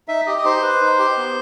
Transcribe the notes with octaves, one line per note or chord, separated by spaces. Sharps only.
D#4 E5
G4 D#5
D#5
D#4 C5
B4
D#4
G4
B3